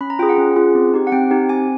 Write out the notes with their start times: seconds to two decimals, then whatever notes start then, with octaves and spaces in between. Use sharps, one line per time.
0.01 C#4 B5
0.10 A#5
0.19 F4 G5
0.23 G#4
0.29 F#5
0.38 C#4
0.56 F4 G#4
0.75 C4
0.94 D#4 G4
1.07 F#5
1.12 C4 G5
1.31 D#4 G4
1.49 C4 G#5